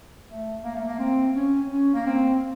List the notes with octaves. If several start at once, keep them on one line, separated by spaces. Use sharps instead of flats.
A3
A#3
A3
A#3
C4
C#4
C#4
A#3
C4